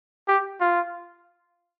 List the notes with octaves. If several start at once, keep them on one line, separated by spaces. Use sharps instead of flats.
G4
F4